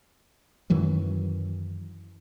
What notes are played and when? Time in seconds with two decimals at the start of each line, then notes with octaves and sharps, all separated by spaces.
0.70 F#2 D#3 E3 F#3